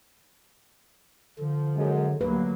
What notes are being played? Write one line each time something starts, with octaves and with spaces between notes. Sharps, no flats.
D3 F3
F#2 G#3
D2 G2 F#3 A#3 B4